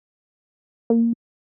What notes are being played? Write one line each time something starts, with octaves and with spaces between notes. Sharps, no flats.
A#3